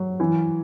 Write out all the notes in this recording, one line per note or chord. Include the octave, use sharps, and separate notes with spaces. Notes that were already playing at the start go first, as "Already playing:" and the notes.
Already playing: F#3
E3